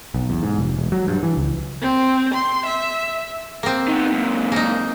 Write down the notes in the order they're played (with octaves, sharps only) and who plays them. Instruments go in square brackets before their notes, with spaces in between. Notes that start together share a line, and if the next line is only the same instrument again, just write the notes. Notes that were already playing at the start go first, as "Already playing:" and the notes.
[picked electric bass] B1
E2
G#2
F1
E1
F#3
G2
E3
C#2
[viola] C4
C6
E5
[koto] A#3 C4
[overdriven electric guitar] D#3 B3
F#2 A#2
[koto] A#3 D#4